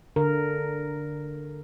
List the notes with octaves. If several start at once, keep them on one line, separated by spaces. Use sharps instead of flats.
D3 A#4